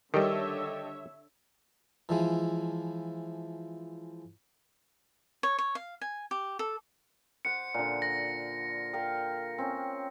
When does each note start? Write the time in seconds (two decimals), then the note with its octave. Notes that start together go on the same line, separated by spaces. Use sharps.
0.14 D3 D#3 G3 G4 A4 C#5 D#5 E5
2.09 E3 F3 G#3
5.43 C#5
5.59 C#5
5.75 F5
6.01 G#5
6.31 G4
6.59 A4
7.45 C5 F#5 C#7
7.74 A#2 D3
8.02 A#6
8.93 A#4 F5 G5
9.58 C4 C#4